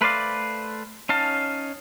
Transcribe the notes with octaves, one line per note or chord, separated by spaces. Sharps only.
A3 B4 C5 D5 F5
C#4 D#4 F5 A5